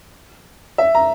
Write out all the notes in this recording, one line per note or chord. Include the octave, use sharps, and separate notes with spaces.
E5
A#5